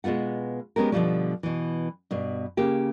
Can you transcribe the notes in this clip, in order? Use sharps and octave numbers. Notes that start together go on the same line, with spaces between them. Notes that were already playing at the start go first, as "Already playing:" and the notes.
B2 G#3 B3 F4 F#5
G#3 B3 C#4 G4 A#4
B2 D3 E3 F3 G3 C#4
B2 E3
G2 B2
C#3 A#3 G4